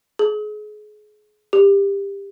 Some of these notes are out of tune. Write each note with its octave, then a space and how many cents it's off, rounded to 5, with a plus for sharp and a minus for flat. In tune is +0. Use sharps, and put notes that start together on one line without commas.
G#4 +30
G4 +20